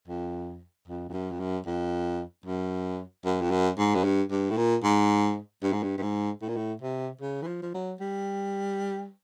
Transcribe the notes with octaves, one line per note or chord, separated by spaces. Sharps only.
F2
F2
F2
F#2
F2
F#2
F2
F#2
F#2
F2
F#2
G#2
F#2
G2
G2
A2
A#2
G#2
G2
G#2
G2
G2
G#2
A2
A#2
A2
C3
C#3
E3
F3
F3
F#3
G3